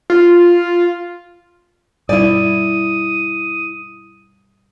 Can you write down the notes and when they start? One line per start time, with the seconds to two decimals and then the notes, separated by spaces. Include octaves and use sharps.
0.10 F4
2.09 G2 B2 G3 E4 D5 D#6